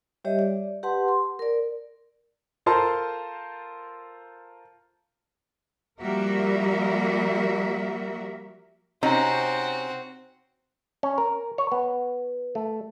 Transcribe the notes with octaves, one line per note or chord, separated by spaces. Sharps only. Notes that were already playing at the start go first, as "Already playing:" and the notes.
G3 G4 C#5 D#5 E5
D5
G4 B4 F#5 A5 C6
C6
A#4 D5
F4 A4 A#4 C5 A5 C6
F3 G3 A#3 F#4 A#4 E5
C3 C4 C#4 D#4 F#4
C#4
A#4
C#5
B3
A3